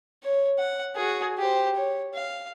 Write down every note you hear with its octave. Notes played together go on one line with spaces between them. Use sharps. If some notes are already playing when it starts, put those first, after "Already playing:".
C#5
F#5
F#4 G#4
G4 C5
C#5
F5